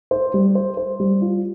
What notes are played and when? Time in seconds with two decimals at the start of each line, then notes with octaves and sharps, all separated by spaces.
0.11 C5
0.34 G3
0.55 C5
0.77 C5
1.00 G3
1.22 F4